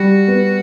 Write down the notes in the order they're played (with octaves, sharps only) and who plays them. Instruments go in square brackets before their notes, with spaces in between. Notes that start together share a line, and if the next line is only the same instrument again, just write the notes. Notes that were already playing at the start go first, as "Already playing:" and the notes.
Already playing: [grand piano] G3 [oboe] F#4
[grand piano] B3